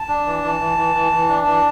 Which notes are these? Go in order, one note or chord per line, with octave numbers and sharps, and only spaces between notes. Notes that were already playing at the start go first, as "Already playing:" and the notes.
Already playing: A5
D4
E3
E3
E3
E3
E3
E3
D4
E3